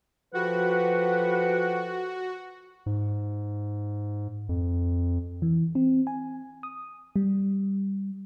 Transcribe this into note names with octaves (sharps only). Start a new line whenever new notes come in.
F3 F#4 G4 A4 B4 F#5
G#2
F2
E3
C4
G#5
D#6
G3